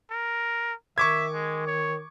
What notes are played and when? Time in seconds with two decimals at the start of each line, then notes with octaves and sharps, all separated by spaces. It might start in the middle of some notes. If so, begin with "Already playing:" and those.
0.11 A#4
0.98 D#3 E5 C#6 D6 G#6
1.33 G#3
1.67 C#5